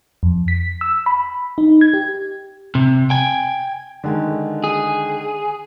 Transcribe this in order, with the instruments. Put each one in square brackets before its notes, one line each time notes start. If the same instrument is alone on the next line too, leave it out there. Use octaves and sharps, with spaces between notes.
[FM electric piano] F2
B6
E6
B5
D#4
G#6
G4
[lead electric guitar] C3
G5 G#5
[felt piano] D3 D#3 G#3
[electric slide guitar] G#4